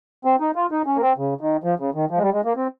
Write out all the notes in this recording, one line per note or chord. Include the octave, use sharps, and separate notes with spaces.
C4
D#4
F4
D#4
C#4
A#3
C4
C#3
D#3
F3
C#3
D#3
F3
G#3
G3
G#3
A#3
C4